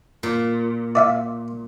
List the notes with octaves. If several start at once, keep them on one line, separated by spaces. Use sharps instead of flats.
A#2
D5 E5 F5